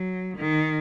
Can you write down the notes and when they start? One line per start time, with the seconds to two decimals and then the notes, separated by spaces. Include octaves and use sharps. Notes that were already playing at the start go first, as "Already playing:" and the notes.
Already playing: F#3
0.37 D#3